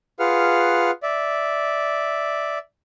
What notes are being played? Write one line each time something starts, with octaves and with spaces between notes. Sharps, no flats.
F4 G#4 B4 F5 F#5 F6
D5 E5